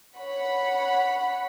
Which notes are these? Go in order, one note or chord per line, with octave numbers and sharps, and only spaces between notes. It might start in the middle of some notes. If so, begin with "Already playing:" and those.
C#5 F#5 B5